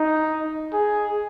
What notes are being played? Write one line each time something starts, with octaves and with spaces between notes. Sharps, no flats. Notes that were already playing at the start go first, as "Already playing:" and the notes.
Already playing: D#4
G#4